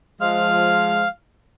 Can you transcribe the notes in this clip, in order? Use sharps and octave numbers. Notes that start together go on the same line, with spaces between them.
F3 G#3 F5 F6